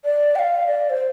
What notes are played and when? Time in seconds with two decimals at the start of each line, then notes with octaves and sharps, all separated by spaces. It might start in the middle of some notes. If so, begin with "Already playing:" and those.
0.05 D5
0.36 G5
0.39 F5
0.67 D5
0.90 C5